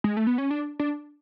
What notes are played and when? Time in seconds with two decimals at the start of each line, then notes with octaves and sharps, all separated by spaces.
0.04 G#3
0.17 A3
0.27 B3
0.38 C#4
0.51 D4
0.79 D4